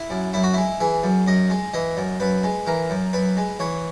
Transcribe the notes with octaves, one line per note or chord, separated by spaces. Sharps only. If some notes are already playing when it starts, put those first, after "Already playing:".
Already playing: E4
F#2
F#2 E4
F#4
G#3 E4
E3 G#4
F#2
F#2 D#5
G#3
E3 D#5
F#2
F#2 B4
G#3
E3 A#4
F#2
F#2 B4
G#3
E3 C#5